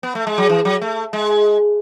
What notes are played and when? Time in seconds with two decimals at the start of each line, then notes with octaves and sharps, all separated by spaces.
0.03 B3
0.15 A3
0.27 G#3
0.38 F#3
0.49 E3
0.65 F#3
0.81 A3
1.13 G#3